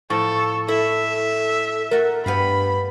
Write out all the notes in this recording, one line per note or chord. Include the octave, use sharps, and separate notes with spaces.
A2 F3 A4 C#6
E4 A4 E5
A3 F#4 A#4
G2 B3 G4 F5 B5